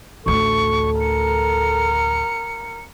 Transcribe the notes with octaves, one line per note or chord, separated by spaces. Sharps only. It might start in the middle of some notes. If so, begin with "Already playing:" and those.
A1 D2 A4 C#6
A#4 C#7